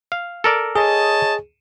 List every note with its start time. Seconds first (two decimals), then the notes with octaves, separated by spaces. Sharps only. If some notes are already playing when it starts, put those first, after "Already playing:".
0.12 F5
0.44 A4 A#4 D5
0.75 G#4 C#5 D#5 A5